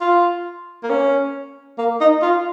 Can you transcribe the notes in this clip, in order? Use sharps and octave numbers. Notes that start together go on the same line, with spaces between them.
F4
A#3
C#4
A#3
D#4
F4